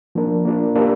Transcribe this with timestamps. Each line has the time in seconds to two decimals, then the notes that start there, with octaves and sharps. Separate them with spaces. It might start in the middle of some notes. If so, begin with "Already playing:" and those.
0.15 F3 A#3 D4 A#4
0.45 A#3 D4 F4 A#4
0.76 A#3 D4 G4 A#4